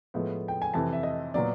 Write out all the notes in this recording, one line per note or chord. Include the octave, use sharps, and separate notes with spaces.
A2 F3 G#3 B3
G5
G#5
F2 C3 E3 A5
E5
D#5
A#2 F#3 B3 D5